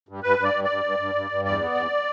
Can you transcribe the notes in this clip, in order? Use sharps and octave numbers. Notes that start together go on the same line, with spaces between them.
G2
G2 B4
G2
D5
G2
D5
G2
G2
G2
G2
G2
E2 D5
B3
E2